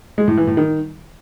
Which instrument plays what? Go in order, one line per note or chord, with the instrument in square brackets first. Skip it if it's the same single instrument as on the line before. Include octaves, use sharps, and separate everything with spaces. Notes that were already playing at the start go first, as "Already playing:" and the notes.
[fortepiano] G#3
A2
E3
A2
D#3